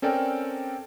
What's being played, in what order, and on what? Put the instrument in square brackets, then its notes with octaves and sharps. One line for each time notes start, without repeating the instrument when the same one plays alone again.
[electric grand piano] C4 C#4 A4 A#4 D5 G5